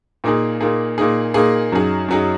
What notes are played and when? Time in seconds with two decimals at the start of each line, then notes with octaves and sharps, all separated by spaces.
0.24 A#2 A#3 D#4 G#4
0.61 A#2 A#3 D#4 G#4
0.98 A#2 A#3 D#4 G#4
1.34 A#2 A#3 D#4 G#4
1.72 F#2 F#3 D#4 G#4
2.08 F#2 F#3 D#4 G#4